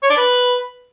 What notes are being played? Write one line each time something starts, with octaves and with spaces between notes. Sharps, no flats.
C#5
D4
B4